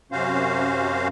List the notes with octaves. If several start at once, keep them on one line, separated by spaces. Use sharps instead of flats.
F#2 C3 C#4 F#4 C5 F5